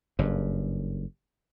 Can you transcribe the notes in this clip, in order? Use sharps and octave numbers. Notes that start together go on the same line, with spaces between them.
F#1 G2